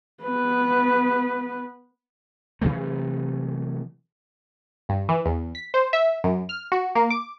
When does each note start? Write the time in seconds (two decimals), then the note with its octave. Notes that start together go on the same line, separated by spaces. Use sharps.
0.23 B3 B4
2.61 C3 E3 F#3 A3
4.89 G2
5.09 E3
5.26 E2
5.55 B6
5.74 C5
5.93 E5
6.24 F#2
6.49 F6
6.72 F#4
6.95 A#3
7.10 D6